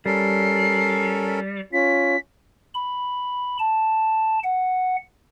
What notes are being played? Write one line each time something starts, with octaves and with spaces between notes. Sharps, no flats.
G3 C#4 A4 A#4 C7
C#4 F4 B6
B5
A5
F#5